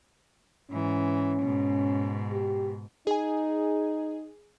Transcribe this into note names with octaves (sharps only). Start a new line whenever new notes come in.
G#2 E3 C#4
G#2 B2
G4
D#4 G#4 G#5